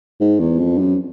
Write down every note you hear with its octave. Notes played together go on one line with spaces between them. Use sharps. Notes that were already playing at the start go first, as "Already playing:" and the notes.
G#2
E2
F2
F#2